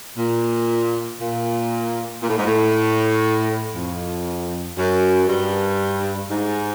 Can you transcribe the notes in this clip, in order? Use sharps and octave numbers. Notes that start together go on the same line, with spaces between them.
A#2
A#2
A#2
A2
G#2
A2
F2
F#2
G2
G#2